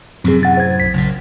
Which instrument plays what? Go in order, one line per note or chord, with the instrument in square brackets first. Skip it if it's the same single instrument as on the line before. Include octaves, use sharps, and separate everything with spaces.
[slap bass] F#2 A2 C3 [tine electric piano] C4 G#4
[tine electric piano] F#5 A6
C5 G#6
B1 B6
[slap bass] F#1 A#2